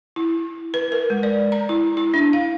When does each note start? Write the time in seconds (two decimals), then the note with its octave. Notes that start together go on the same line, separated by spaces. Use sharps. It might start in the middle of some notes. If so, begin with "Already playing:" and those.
0.16 E4
0.74 B4
0.92 A#4
1.10 G#3
1.23 D5
1.52 A#5
1.69 E4
1.97 E4
2.14 D4
2.33 F5